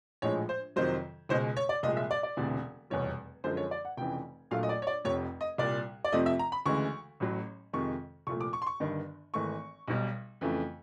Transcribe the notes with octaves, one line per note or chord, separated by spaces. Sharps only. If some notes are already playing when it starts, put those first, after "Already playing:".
A#1 A2 F3 G#3 C#5
C5
F2 C3 D#3 F#3 C5
C#2 B2 G#3 C5
C#5
D5
C2 A#2 F3 G#3 D#5
E5
D5
D5
E1 D2 C3 E3
F1 E2 B2 G3 C#5
F#2 D3 F3 G#3 C5
C#5
D5
F#5
F1 F2 C#3 E3 G5
A#1 A#2 F#3 A3 F5
D#5
D5
C#5
D5
F1 F2 C3 C#5
D#5
C2 A#2 G3 D5
D5
F2 C3 F3 A3 D#5
E5
A#5
B5
D2 C#3 E3 G#3 C#6
A1 A2 F#3
F2 C3 D#3 G#3 C#6
C2 A#2 F3 A3 C#6
D6
C#6
C6
C#6
G1 G2 D#3
G#1 G#2 E3 A3 C#6
B1 B2 G3
F2 C#3 E3 A3